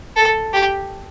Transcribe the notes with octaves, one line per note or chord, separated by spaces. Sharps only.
A4
G4